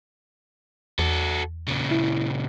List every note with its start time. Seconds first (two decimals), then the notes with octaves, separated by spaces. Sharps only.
0.99 E2 F#4 A4
1.68 A#2 C#3
1.91 E4